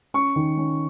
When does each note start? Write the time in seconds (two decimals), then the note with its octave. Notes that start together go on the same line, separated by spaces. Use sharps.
0.14 C#4 C#6
0.36 D#3
0.57 C#4